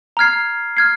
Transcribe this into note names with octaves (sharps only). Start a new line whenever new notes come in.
A#5 F6 G#6 C7
F6 G#6 C7